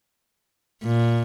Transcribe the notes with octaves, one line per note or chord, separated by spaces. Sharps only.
A#2